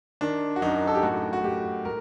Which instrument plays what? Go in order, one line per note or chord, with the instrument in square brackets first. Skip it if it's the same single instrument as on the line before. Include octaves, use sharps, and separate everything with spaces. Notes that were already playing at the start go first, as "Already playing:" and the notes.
[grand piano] D#3 D4
F#4
F#2 D#4
A4
G4
A2 F#4
F#4
A2 G4
A2 A#4